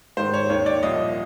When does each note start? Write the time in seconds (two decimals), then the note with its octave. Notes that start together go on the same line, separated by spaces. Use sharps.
0.17 G#2 D#3 C5
0.34 C#5
0.50 D#2 D#3 C#5
0.66 D5
0.83 C2 A#2 F3 D#5